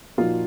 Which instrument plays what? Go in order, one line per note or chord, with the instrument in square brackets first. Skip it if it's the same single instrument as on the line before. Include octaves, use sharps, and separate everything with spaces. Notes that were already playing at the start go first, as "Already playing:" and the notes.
[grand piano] A#2 F3 A#3 D#4 F#4 [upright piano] F4